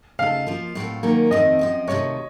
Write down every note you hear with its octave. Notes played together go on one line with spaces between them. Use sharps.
C#3 A3 D#4 A4 F5
F3 A#3 F4 C5
A2 F#3 C4 F4 A4
D#3 F#3 A#3 C#4
F2 C3 D#3 A3 C4 D#5
F#2 F3 C4
C3 D#3 F#3 A3 C#5